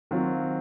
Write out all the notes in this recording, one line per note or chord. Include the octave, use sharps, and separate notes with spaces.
D#3 F#3 C4 F4